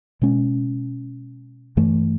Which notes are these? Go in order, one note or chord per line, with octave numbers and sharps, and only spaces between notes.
B2 G#3 C#4
G2 E3 A3